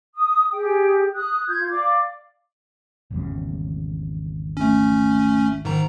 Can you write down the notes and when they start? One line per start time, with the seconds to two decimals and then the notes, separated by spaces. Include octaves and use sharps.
0.15 D#6
0.51 G4 G#4 G5
1.14 D#6 F#6
1.47 F4 G6 G#6
1.70 D5 F5 D6
3.10 G#1 E2 C#3
4.57 A3 C#4
5.65 G#2 D#3 A#5